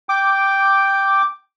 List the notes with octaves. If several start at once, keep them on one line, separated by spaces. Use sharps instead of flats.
G5 D6